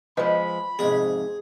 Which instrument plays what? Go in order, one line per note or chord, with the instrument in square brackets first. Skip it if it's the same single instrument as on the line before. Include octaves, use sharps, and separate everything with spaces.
[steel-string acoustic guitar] F3 G#3 [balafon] B4 D#5 [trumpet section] B5
[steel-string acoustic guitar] F2 G#2 C3 [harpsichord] G#4